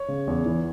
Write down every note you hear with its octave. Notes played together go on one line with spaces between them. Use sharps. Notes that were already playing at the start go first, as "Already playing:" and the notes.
Already playing: C#5
C#3
E2
E3